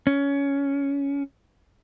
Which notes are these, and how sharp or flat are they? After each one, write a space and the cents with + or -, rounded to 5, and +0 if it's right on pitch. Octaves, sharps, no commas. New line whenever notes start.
C#4 +15